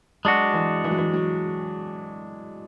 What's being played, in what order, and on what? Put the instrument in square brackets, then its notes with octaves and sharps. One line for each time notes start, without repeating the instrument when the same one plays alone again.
[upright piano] F#3 [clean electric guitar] G#3 D4 F#4
[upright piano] E3
E3
F#3
E3
F#3